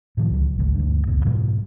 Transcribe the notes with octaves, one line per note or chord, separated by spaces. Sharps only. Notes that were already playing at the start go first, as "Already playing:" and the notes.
A2 D#3 F3
C#2 F#3
G#1 C#2
D2 G2
C#2 F#2 A#2
G#2 B2 E3 G3